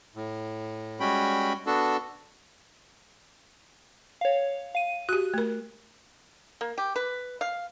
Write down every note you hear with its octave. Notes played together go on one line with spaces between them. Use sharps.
A2
G3 G#3 C#4 F#4 G5 B5
B3 D4 F#4 A4
C#5 F5
F5 D#7
F#4 G4 F#6
A3 A#4
A#3
G4
B4
F5